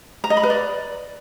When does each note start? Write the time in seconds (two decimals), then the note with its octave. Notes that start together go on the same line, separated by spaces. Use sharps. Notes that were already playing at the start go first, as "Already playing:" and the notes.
0.24 A#5
0.30 D#5
0.37 B5
0.43 B4
0.50 D5